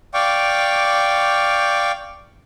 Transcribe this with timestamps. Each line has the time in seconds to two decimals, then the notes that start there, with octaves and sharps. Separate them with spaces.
0.14 D5 F5 G5 C#6 D6